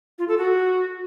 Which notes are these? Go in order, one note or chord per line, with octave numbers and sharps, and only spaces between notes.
F4
A4
F#4